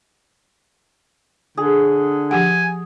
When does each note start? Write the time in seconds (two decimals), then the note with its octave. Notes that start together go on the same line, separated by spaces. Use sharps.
1.57 D3 G#4
2.31 F3 G4 F#5 G#5